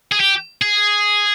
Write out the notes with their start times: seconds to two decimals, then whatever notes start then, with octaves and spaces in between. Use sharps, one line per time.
0.12 G#4
0.20 G4
0.62 G#4